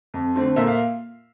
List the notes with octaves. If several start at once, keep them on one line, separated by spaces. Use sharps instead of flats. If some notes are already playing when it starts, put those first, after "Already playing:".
F2
D3 A3 C4
A#2 E5
F5